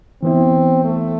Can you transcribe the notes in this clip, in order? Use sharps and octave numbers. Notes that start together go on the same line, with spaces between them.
E3 B3 C4 E4
A3